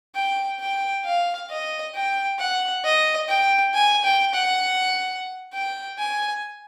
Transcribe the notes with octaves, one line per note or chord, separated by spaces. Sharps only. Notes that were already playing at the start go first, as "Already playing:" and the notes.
G5
G5
F5
D#5
G5
F#5
D#5
G5
G#5
G5
F#5
G5
G#5